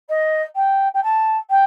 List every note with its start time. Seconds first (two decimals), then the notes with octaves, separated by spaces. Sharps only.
0.09 D#5
0.55 G5
0.94 G5
1.03 A5
1.50 G5